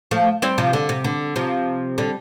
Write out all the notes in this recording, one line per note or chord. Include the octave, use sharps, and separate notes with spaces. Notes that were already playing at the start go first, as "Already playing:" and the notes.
F3 A3
G3 C4
C3 F3
D3
C3
D3
C3 F3
D3 G3